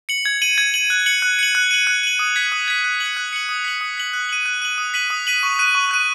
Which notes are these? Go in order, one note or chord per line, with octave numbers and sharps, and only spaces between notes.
C#7 F#7
G#6
D#7 F#7
G#6
D#7 F#7
F#6
C#7 F#7
F#6
C#7 F#7
F#6
D#7 F#7
F#6
D#7 F#7
D#6
G#6 B6
D#6
G#6 B6
F#6
C#7 F#7
F#6
C#7 F#7
D#6
B6 F#7
D#6
B6 F#7
F#6
D#7 F#7
F#6
D#7 F#7
D#6
B6 D#7 F#7
D#6
B6 D#7 F#7
C#6
F#6 D#7
C#6
F#6 D#7